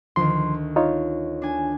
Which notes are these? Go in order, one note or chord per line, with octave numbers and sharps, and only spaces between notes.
D2 D#3 F3 C6
D#4 F4 C#5
D4 G#5